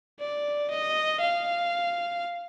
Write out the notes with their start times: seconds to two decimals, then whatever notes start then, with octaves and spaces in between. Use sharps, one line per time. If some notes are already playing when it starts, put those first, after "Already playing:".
0.20 D5
0.70 D#5
1.20 F5